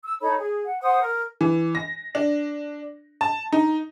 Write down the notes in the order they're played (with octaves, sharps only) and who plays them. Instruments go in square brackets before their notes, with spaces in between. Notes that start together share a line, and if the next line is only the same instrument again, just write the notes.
[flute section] E6
D#4 A4 C#5 B5
G#4
F#5
C5 F#5 D#6
A#4
[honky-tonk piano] E3
A#6
D4
A5
D#4